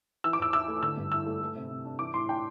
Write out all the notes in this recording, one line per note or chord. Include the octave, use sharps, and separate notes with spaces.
E3 E6
D6
E2 E6
E4 E6
A3
D3 E6
G2
E4 E6
A3
A3
C3
C3
D4
E3 D6
A2 C6
D4 G5